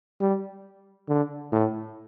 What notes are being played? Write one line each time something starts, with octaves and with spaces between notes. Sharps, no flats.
G3
D3
A2